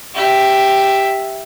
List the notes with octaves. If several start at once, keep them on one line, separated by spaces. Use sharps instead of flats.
G4 E5